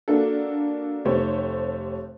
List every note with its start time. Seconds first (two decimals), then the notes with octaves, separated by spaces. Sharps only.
0.08 A#3 D4 F#4 A4
1.05 F1 A3 G4 C5 C#5